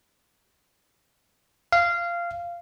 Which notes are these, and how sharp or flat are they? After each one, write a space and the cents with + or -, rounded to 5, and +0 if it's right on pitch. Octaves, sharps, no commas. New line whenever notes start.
F5 -15